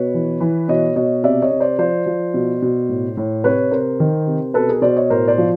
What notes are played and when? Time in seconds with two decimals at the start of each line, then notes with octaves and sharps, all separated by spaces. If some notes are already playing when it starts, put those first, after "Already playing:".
Already playing: B2 B4 C#5
0.14 E3
0.40 E3
0.68 B2 C#5 D#5
0.96 B2 C#5 D#5
1.23 C3 D5 E5
1.42 C#5 D#5
1.51 C3
1.60 C5 D5
1.78 F3 C5 D5
2.06 F3
2.34 B2
2.62 B2
2.89 A2
3.17 A2
3.44 C3 B4 C#5
3.71 C3 A#4 C5
4.00 D#3
4.27 C3
4.54 B2 A4 B4
4.69 G#4 A#4
4.82 B2 C5 D5
4.96 C#5 D#5
5.10 A2 A#4 C5
5.28 C5 D5
5.38 F3